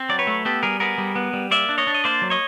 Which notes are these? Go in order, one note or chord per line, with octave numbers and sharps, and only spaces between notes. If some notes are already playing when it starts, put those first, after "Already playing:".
Already playing: C4
F#3 D5
B4 C#5
A3
B3 G4 A4
G3 G#4 A#4
B3 G#4 A#4
G3
B3
G3
A#3 D5 E5
D4
C#5 D#5
D4
D#5
A#3 C5 D5
F#3
C#5 D#5